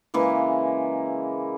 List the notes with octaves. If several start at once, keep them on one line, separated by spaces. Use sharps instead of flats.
C#3 E3 G#3 A#3